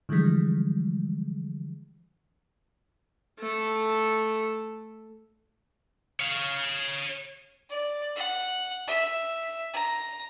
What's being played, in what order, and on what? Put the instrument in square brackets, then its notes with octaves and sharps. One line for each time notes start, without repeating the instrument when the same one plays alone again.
[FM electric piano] D3 E3 F3 G3 G#3
[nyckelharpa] A3 A4
[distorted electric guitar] C#5 F5
[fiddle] D5
F#5
E5
A#5